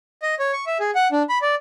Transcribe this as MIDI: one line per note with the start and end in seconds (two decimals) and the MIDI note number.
0.22 0.35 75
0.39 0.52 73
0.53 0.65 85
0.67 0.78 76
0.80 0.91 68
0.95 1.08 78
1.12 1.23 62
1.29 1.38 83
1.42 1.55 74